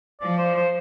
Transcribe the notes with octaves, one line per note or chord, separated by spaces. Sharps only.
F3 D5
C5
C5